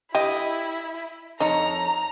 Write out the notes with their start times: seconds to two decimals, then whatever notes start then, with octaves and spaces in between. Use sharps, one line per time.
0.15 E4 G4 D#5
1.40 F2 D#4 C#5 A#5